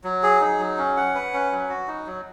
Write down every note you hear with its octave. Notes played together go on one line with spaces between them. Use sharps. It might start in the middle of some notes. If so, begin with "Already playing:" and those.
F#3
G#4
D#4
F#3
C#4
F#5
B4
C#4
F#3
F#4
D#4
F#3